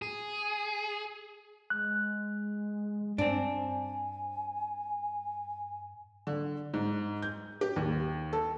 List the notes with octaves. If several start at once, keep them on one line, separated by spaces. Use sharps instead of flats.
G#4
G#3 F#6
G2 C4 D4 G#5
D3
G#2
G6
G4
D#2
A4